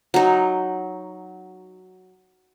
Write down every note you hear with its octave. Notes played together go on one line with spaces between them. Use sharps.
F#3 D#4